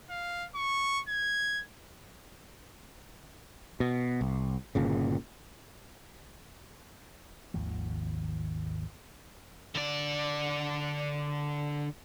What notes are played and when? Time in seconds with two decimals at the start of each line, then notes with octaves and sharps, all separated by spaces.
0.10 F5
0.55 C#6
1.09 G#6
3.80 B2
4.21 C2
4.75 G1 A#2 C#3
7.54 G#1 D#2 F3
9.75 D3 D5